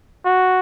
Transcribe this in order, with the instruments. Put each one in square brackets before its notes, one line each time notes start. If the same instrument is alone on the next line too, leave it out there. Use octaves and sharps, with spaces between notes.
[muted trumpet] F#4